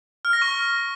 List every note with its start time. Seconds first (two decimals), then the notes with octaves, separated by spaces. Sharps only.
0.25 F6
0.33 A#6
0.42 C#6